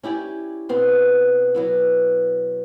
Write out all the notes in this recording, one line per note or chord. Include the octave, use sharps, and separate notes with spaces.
C#4 E4 G4 D5
B2 B3 C4 C6
F#3 B3 E4